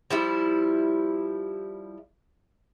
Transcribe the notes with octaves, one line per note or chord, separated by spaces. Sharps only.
F3 G3 E4